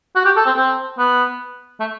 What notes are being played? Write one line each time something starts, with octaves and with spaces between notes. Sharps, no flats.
F#4
G4
A4
C4
C4
B3
A3